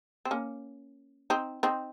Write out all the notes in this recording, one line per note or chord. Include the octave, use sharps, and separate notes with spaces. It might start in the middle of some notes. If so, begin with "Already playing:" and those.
C4
A#3 C#4
C4 D#4
C4 D#4